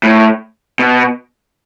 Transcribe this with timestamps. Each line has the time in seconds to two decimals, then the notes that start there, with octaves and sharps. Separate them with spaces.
0.03 A2
0.79 B2